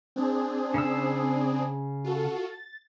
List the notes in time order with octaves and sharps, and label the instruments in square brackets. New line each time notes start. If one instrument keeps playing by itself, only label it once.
[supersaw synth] C4 D4 G#4
[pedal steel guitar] C#3 E6
[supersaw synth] F4 F#4 A4
A6